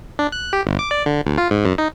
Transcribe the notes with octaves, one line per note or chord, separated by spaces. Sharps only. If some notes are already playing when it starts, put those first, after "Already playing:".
D4
F#6
G4
G1
D6
D5
D3
D2
F4
G#2
F#2
D#4